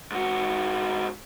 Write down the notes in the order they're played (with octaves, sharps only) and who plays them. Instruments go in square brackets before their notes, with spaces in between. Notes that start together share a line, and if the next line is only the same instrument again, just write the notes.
[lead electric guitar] G#2 F#4